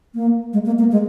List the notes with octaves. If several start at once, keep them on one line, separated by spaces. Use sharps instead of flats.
A#3
G#3
A#3
A#3
G#3